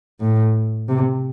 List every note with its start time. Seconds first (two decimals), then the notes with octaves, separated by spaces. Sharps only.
0.20 A2
0.88 C3